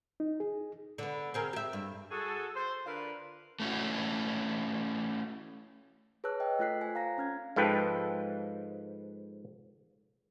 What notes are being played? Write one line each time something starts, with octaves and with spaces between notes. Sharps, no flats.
D#4
G#4
D3 B3
C4 G#4 A#4
G4 E5
G2
F#4 G#4 A4
C5
D3 D4 F4 A#4 B4
A3 C#4 E4 F#4
G#4 B4 C#5 A5 E6 F#6
D#5 G5
A3 F4 A4 F#6 B6 C7
C5 G#5
F5 A#5 A#6
C#4 F6 G#6
G#2 F3 A4 B4 G5